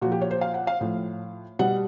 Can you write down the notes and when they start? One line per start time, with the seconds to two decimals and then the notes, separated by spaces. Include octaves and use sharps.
0.01 A#2 F#4
0.05 F3
0.12 G4
0.21 C#5
0.31 C5
0.41 F5
0.54 F#5
0.67 F5
0.81 A2 F3
1.59 B2 G3 F#5